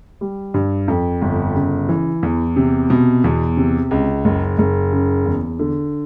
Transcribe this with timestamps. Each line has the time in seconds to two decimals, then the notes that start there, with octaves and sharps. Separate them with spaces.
0.21 G3
0.54 G2
0.88 F2
1.21 G1
1.55 C#3
1.89 E3
2.23 E2
2.56 C3
2.90 B2
3.24 E2
3.57 C3
3.91 C#2
4.25 F#1
4.58 F#1
4.92 C#3
5.26 E2
5.59 D3